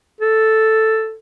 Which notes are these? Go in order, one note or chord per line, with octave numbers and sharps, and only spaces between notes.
A4